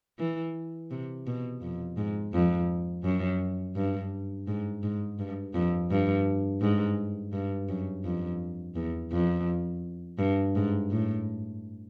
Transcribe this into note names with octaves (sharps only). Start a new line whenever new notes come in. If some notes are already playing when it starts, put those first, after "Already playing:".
E3
C3
B2
F2
G#2
F2
F#2
G2
G#2
G#2
G2
F2
G2
G#2
G2
F#2
F2
E2
F2
G2
G#2
A2